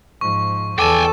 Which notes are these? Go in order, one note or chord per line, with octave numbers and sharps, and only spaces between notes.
G#2 F3 C#6
E2 A4 G5 G#5 D6 E7